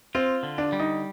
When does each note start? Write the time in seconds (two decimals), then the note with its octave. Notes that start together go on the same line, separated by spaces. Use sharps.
0.15 C4 F4
0.43 D3
0.58 D4
0.72 G3
0.79 D#4